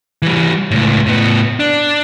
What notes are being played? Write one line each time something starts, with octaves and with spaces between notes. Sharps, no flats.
E3 G3
C#2 A2
A2 B3
D4